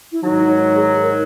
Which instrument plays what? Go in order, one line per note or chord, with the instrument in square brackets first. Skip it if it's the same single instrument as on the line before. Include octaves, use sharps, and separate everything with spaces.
[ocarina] E4
[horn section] G#2 D#3 F#3 [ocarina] D#4
[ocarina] G#4
A#4